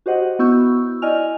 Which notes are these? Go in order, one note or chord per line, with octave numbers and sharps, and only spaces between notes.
F#4 G4 C5 D#5 F#5
B3 E4 F#4 C#6 E6 G6
E4 D5 D#5 G#5 F6 F7